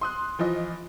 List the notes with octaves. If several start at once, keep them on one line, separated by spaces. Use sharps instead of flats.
C6 D#6 F#6
E3 F3 F4 D#5